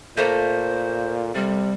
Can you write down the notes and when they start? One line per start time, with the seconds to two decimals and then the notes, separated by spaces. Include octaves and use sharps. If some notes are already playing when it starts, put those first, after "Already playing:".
0.17 A#2 A3 A#3 C5
1.35 C3 G3